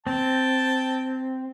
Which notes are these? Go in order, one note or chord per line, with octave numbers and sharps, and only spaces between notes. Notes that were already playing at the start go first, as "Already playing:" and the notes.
C4 G5 A5